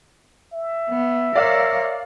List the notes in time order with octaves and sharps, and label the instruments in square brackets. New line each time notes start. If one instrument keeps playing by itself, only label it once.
[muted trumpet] E5
[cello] B3
[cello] A#4 C#5 [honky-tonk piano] D5 F5 E6